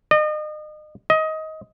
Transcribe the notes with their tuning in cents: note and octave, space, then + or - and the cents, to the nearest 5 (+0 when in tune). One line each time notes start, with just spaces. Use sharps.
D#5 -35
D#5 +20